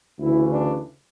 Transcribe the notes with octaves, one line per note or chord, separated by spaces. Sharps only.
D2 C#3 E3 E4
D4